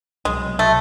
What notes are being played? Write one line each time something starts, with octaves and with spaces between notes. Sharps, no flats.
C2 B2 F#3 G#3
A3